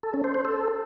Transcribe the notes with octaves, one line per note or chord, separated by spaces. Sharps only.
A4
C#4
C5
C5
A4